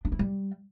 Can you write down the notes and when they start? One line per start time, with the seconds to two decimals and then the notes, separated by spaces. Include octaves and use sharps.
0.05 D4
0.12 E4
0.19 G3